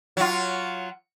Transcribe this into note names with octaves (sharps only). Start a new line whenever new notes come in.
F#3 F4